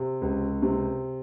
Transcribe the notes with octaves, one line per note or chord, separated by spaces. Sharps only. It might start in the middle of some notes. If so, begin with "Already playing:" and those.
Already playing: C3
C#2
C3